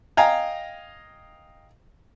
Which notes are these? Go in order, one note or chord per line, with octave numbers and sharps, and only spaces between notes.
D#5 F5 G5 G#5 A#5